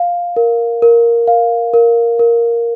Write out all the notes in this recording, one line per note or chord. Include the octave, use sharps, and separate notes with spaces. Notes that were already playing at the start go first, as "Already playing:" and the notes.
Already playing: F5
A#4
A#4
F5
A#4
A#4